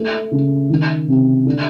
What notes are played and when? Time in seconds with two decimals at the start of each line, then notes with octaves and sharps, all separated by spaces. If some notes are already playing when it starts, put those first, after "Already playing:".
Already playing: A3
0.31 C#3
0.70 D#3
1.08 C3
1.46 D3